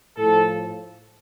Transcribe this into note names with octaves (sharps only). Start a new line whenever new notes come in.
A2 F3 A4